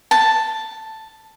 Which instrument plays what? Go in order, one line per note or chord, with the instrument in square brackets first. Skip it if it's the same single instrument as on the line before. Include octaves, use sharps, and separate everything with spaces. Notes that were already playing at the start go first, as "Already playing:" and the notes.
[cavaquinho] A5